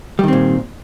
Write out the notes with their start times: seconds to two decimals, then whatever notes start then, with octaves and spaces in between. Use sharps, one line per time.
0.19 G3
0.23 D#3
0.28 C4
0.33 A#2